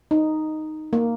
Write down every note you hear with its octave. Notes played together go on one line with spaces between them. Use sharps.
D#4
A#3